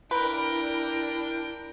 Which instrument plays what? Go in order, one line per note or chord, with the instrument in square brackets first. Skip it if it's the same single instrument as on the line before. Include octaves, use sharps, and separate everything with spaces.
[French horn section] D4 [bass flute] E4 [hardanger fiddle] A#4 G5 [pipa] B4